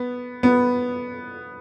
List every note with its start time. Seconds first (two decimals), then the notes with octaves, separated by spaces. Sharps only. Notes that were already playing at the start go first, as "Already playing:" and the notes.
Already playing: B3
0.43 B3